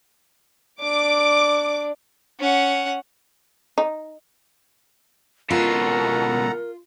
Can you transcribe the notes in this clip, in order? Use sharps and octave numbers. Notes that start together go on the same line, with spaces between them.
D4 D6
C#4 F#5
D#4
C#2 B2 F4 A4 A#4 F#5 A#5